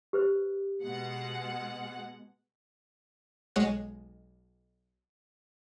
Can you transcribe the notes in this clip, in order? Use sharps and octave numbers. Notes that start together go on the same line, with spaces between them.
G4 B4 C5
B2 G#3 F#5
B1 G#3 C#5 F#5 G#6